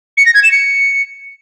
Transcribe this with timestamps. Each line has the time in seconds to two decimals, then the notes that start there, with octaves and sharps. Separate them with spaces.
0.17 C#7
0.26 A#6
0.34 G#6
0.43 E7
0.52 C#7